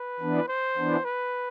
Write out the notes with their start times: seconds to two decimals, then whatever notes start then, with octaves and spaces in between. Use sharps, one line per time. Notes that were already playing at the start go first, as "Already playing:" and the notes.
Already playing: B4
0.20 E3 B3 D4
0.48 C5
0.77 E3 B3 D4
1.05 B4